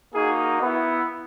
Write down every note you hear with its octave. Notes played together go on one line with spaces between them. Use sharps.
A#3 D#4 F#4 G#4
B3 E4